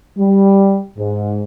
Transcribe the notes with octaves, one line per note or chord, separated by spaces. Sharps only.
G3
G#2